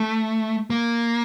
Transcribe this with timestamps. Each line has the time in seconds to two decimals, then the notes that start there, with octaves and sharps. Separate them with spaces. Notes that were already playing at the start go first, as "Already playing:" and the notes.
Already playing: A3
0.70 A#3